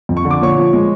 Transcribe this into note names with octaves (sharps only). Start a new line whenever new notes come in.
F2
C#6
D3
D6
A#2 C#5 C#6
F3
G#3